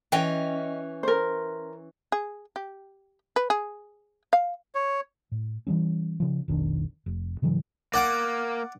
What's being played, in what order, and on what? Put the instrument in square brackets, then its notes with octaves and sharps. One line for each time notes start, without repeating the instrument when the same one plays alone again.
[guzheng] E3 C#4 [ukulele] D#5 G5
[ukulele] A#4 C5
[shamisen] G#4
G4
B4
G#4
F5
[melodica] C#5
[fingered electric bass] A2
E3 F3 G3 C#4
C#3 F3
F1 B1 D#3 D4
F1
G#2 C#3 E3 F#3
[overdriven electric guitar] A#3 [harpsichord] D5 F#5 D6